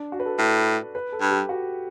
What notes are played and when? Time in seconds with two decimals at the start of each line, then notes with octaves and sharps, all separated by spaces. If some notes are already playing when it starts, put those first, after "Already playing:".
Already playing: D4
0.12 F#4
0.20 B4
0.26 A4
0.39 A2
0.95 B4
1.12 A4
1.21 G2
1.31 G4
1.49 F#4